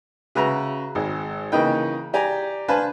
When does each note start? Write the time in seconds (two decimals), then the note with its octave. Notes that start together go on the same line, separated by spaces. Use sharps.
0.35 C#3 F#4 B4 E5 A#5
0.95 G#1 G#3
1.52 C#3 E3 A#3 D#4 B4 G5
2.14 G4 D5 G#5 A#5
2.68 D4 B4 C5 F5 G#5 A5